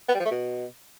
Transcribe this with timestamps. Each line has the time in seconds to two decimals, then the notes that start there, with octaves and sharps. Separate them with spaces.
0.09 B3
0.14 G3
0.20 F3
0.25 A3
0.31 B2